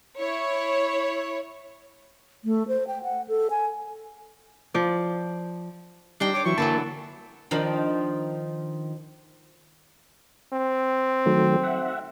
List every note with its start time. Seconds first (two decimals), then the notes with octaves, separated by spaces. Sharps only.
0.19 E4 C#5
2.45 A3
2.68 C5
2.87 G5
3.03 F#5
3.28 A4
3.50 G#5
4.74 F3 D5
6.20 G3 D4 D#4 C5 G5
6.34 C#5 D6
6.45 E3 F#3 E4 C#6
6.58 D3 E3 F#3 A#3 A5
7.51 D#3 F3 D4
10.53 C4
11.26 D#3 F#3 A3
11.63 E5 F#5